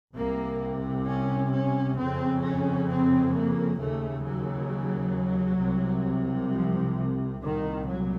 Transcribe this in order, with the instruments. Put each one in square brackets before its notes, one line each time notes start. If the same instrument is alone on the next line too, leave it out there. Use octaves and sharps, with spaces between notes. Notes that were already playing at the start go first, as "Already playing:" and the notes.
[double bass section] C2 C3 A#3
C#4
C#4
F2 C#3 C4
C#4
C4
A#3
D#2 C#3 A3
F#3
C2 C3
F3
C2 A#2 D#3
F#3